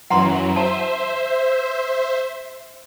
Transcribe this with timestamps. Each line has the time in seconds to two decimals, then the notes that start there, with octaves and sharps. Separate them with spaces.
0.10 F#2 E3 F#3 F#5 A#5 C6
0.56 C5 E5 A5